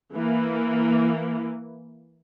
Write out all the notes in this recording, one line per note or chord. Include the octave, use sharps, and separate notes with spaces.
E3 A#3